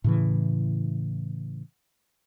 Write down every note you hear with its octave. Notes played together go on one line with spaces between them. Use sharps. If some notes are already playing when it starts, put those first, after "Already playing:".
A2 C#3 E3